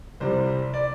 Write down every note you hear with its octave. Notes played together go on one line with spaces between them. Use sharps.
C2 C3 G3 C5
D5